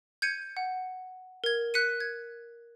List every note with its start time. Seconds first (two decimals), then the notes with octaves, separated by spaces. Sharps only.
0.22 G6 G#6 C#7 D#7
0.57 F#5
1.44 A#4 G#6
1.74 F#6 B6 C#7 D#7
2.00 G#6